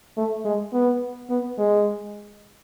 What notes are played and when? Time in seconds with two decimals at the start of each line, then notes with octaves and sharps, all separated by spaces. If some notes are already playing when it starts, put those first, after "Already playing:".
0.17 A3
0.45 G#3
0.73 B3
1.30 B3
1.58 G#3